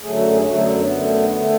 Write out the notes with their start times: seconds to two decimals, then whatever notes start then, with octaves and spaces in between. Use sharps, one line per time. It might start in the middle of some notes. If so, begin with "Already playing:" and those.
0.02 F#2 D3 F#3 A3 G#4
0.17 F#4
0.32 G#4
0.46 F#2 D3 F#3 A3 F#4
0.58 B3
0.68 A3
0.80 B3
0.90 F#2 D3 A3
1.36 D3 A3